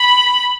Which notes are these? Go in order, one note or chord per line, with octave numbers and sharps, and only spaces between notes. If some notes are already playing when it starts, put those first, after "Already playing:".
Already playing: B5